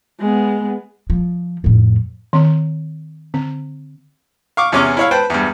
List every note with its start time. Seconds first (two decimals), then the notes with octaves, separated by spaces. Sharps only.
0.19 G#3 B3
1.10 F3
1.64 F2 A2
2.33 D#3 C4
3.34 D3 C4
4.57 F5 C#6 D6
4.72 E2 C3 C#4 C#6 D6 F6
4.97 E4 C#5 F5
5.11 B4 C5 G5 A5
5.30 E2 G2